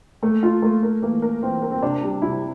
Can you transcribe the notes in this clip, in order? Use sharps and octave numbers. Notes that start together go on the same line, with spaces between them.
A3 A#3
F4
A3 A#3
A#4
E3 A#3
A#4
E3 C4
A#4
C4
C3 D4
G3
C3 E4